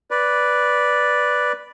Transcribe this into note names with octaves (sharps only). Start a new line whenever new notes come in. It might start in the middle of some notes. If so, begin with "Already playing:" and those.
B4 D5